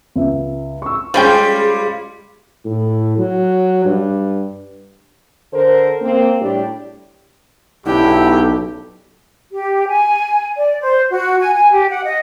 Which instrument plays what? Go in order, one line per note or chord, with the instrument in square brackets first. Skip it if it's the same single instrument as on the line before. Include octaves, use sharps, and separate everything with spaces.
[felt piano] C#2 E5
C#6 E6
[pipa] F3 C#4 G5 [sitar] G3 G#3 F4 [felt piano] B5 C6
[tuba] A2
F#3
G2
[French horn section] D3 A4 A#4 C5
A#3 C4
A2 G3 D4 G4
[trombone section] B1 [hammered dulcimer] D3 C#4 G5 [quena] E4 [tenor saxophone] G4
[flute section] G4
G#5
D5
C5
F#4
G#5
G#5
G4
F#5
D#5